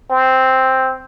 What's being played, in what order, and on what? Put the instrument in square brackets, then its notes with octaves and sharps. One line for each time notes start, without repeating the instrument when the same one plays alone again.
[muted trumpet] C4